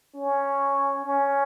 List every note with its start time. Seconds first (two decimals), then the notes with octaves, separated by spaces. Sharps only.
0.15 C#4
1.05 C#4